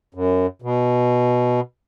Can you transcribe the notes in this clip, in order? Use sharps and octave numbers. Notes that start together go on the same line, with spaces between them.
F#2
B2